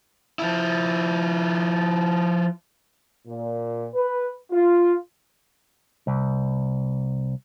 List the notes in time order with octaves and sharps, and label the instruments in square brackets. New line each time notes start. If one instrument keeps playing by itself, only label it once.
[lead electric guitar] F3 E4
[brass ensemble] A#2
B4
F4
[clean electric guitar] C2